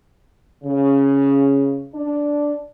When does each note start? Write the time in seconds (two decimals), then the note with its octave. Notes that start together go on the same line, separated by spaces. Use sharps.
0.64 C#3
1.94 D4